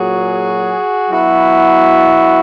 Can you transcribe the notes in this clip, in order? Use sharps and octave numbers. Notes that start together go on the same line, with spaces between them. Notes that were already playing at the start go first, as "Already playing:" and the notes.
Already playing: A#2 F#3 F#4 G#4
B2 F#3 E4 F#4